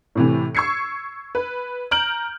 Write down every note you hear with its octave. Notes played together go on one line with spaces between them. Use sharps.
A2 C3 E3
C#6 E6 G#6 C7 C#7
B4
A#5 F6 G6 D7 F#7